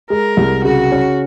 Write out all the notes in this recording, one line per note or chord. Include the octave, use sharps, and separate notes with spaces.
G#3 A#4
C2
C#3 F#4
C#4